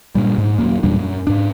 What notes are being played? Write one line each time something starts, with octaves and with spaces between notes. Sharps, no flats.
G2 A#2 G3
G#2
D#1 F#2 A#3
E2 A#2 G3 D4
F#2
G#2 D4